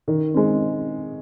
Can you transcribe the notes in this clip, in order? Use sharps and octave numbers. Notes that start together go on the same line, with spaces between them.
D#3
G#3 C4